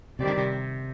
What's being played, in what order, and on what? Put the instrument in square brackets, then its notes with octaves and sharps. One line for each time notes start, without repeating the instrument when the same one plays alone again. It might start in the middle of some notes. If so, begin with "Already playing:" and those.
[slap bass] C3 [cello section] D#3 G3 C4 G4 D5
[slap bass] D3
C3